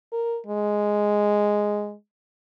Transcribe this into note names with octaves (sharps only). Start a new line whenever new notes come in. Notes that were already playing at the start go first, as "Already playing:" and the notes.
A#4
G#3